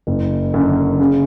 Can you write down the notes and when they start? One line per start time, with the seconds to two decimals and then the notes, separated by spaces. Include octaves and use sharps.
0.07 F#1
0.54 F#2 D3
0.99 C#3